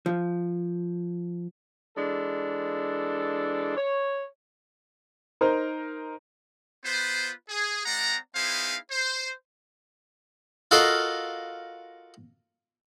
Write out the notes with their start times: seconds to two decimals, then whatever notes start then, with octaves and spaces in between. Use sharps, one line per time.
0.06 F3
1.97 E3 G#3 D4 A4
3.77 C#5
5.41 D#4 A#4 C5
6.84 B3 F4 B4 C5
7.49 G#4
7.86 G#3 C4 D5 F#5 A#5
8.36 B3 D#4 E4 G#4 C5 F5
8.91 C5
10.71 F4 F#4 A4 A#4 D#5 F5